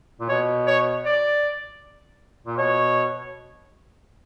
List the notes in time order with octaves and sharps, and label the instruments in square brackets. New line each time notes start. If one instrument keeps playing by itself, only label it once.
[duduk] A#2
[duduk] B2 [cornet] C#5
[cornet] C#5
D5
[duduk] A#2
[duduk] B2 [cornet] C#5